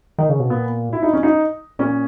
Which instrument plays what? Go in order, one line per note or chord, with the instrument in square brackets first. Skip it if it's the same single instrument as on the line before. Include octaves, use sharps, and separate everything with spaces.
[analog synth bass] D#3
C#3
B2
[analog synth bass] A#2 [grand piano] B3
[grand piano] E4
D#4
C#4
D#4
[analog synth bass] A#2 [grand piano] C#4